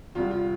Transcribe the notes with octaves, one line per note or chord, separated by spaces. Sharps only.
E2 C3 G3 F4
F4